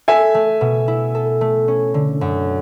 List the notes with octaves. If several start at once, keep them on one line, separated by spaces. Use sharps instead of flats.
A4 E5 G#5
A3
B2
E4
A4
A3
C#4
D3
F#2